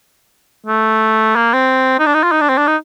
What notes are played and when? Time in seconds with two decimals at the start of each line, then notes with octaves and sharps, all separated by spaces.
0.66 A3
1.36 A#3
1.54 C4
1.99 D#4
2.06 D4
2.14 D#4
2.24 F4
2.32 D#4
2.41 D4
2.49 C4
2.58 D4
2.68 D#4